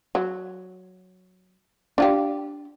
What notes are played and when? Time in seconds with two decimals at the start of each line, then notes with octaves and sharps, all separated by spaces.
0.15 F#3
1.98 D4 F4 G4